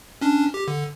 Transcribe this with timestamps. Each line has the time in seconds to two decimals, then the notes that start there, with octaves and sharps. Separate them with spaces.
0.21 C#4 D4
0.54 G4
0.68 D3